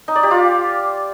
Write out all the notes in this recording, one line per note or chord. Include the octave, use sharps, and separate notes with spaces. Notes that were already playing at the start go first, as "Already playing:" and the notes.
D#4
D5
G4
F4